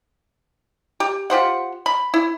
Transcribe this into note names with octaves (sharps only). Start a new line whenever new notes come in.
G4
F4 G4 C5 F#5
B5
E4